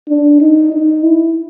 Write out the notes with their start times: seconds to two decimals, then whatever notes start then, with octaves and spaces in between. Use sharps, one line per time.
0.09 D4
0.41 D#4
0.72 D#4
1.03 E4